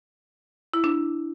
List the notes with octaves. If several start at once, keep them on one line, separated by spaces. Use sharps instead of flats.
E4
D4